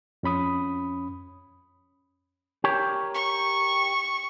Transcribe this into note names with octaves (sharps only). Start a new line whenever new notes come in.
F2 C#4 B5 D#6
G4 A#4 C#5
C#6